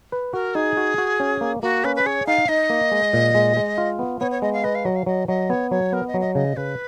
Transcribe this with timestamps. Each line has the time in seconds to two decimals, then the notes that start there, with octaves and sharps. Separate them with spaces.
0.12 B4
0.33 F#4 A#4
0.55 D#4 G#4
0.77 F#4
0.98 F#4
1.20 C#4
1.41 A#3
1.62 A#3 F#4
1.84 C#4 B4
1.96 B4
2.06 G#4 C#5
2.27 D#4 F5
2.48 D#4 D#5
2.70 A#3
2.92 G#3
3.13 A#2
3.35 G#3
3.57 G#3
3.78 F4
3.99 B3
4.20 B3 C#5
4.31 C#5
4.42 G#3 D#5
4.53 F5
4.64 B4 D#5
4.75 F5
4.85 F#3 D#5
4.96 F5
5.06 F#3 D#5
5.28 F#3 D#5
5.50 B3 C#5
5.71 F#3 C#5
5.93 B3 A#4
6.08 D#5
6.14 F#3
6.21 D#5
6.35 C#3 D#5
6.57 C#3 B4